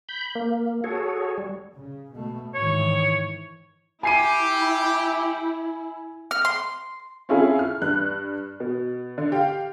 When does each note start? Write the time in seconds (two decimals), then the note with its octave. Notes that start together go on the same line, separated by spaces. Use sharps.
0.09 B5 G6
0.35 A#3
0.84 F#4 G#4 A4 C#5
1.38 G3
1.74 C#3
2.13 B2 A3
2.54 G#2 D#3 E3 C#5
4.03 E4 G4 G#5 C7 D#7
6.31 F6
6.45 C6
7.29 C4 C#4 E4 F4 G#4 A4
7.59 F6
7.82 G2 F#6
8.60 B2
9.18 D3
9.32 G4 F5